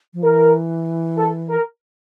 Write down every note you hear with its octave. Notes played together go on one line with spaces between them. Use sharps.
F3
E3 A#4
A4
A#4